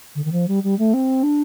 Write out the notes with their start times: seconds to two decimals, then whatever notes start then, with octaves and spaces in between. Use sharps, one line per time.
0.15 D3
0.24 D#3
0.32 F3
0.48 G3
0.63 G3
0.79 A3
0.93 C4
1.23 D4